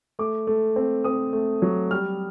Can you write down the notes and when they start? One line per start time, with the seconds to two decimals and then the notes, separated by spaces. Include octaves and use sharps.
0.19 A3 D6
0.47 A3
0.76 C4
1.04 C4 D#6
1.33 A3
1.62 F#3
1.91 G3 F6